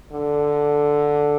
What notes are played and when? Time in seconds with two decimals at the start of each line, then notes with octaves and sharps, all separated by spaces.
0.12 D3